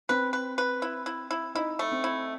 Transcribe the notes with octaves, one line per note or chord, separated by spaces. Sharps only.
C4 B4
B4
B4
E4
E4
E4
D#4 E4
A3
C4
E4